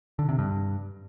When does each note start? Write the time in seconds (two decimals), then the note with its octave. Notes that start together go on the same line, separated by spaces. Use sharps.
0.19 D3
0.29 C3
0.39 G2